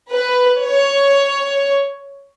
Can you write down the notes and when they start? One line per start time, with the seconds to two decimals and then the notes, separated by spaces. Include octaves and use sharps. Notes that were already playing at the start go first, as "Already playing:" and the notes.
0.10 B4
0.62 C#5